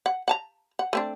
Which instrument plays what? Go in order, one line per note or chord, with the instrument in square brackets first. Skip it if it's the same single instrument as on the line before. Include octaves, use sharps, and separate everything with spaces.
[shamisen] F#5
F#5 A5 A#5
F#5
A3 C4 D4